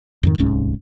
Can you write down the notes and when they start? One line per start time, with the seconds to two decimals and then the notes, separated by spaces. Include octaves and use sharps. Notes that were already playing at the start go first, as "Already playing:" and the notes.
0.23 F2 G#2 D#3
0.38 D1 C2 G#2 C#4